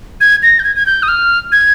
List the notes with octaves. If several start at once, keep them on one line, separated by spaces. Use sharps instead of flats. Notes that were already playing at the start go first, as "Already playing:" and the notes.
G#6
A#6
G6
G#6
G#6
G6
D#6
F6
G#6